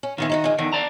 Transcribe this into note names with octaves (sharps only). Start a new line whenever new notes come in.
C#4
D#3 E3 B3 F4
D#4 E4 F#4
A#2 G#3
E2 D3 D#3
D5 A5 A#5